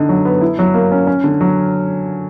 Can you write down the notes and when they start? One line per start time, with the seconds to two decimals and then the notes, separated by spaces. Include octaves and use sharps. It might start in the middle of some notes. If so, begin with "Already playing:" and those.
Already playing: D3 D#4
0.09 F#3
0.25 B3
0.41 E4
0.59 F#3
0.74 A#3
0.92 C#4
1.07 C#4
1.24 D3
1.41 F#3